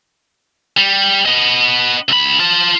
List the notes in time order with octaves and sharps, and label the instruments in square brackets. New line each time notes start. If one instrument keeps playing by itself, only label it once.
[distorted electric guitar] G3
B3 D#5
C#2 B5
F4 A5